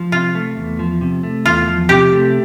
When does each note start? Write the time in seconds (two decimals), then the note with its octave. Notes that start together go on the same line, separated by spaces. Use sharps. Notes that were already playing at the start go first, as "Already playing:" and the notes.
Already playing: F3
0.12 C3 F4
0.35 A3
0.57 E2
0.79 F3
1.01 C3
1.23 A3
1.46 E2 F4
1.67 F3
1.89 C3 G4
2.12 A3